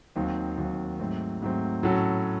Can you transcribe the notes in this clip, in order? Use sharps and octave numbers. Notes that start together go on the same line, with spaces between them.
D#2 D#3 F#3 C4
D#2 D#3 F#3 C4
G#2 F#3 A3 C4
G#2 F#3 A3 C4
A2 F#3 C#4 F#4 A4